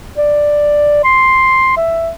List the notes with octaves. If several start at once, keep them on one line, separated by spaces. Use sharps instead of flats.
D5
C6
E5